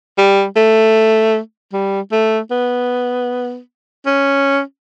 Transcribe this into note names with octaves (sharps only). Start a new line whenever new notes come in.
G3
A3
G3
A3
B3
C#4